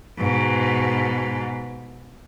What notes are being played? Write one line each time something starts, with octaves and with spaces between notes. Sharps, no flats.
G#2 B2